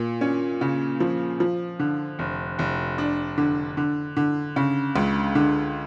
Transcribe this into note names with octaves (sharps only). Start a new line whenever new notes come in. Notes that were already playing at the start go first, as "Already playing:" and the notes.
Already playing: A#2
C#4
C#3
F3
F3
D3
F1
F1
D4
D3
D3
D3
C#3
C#2
D3